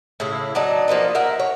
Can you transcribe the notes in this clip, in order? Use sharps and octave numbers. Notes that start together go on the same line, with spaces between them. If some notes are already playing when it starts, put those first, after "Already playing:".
A2 C#3 E4
F#3 D4 D#4
F3 A#3 B3 D#4
A#4 E5 F#5
C#5